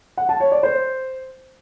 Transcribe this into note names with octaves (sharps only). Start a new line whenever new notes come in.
F#5
A5
C#5
D5
C5